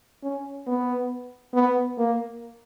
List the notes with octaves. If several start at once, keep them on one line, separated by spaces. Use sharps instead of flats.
C#4
B3
B3
A#3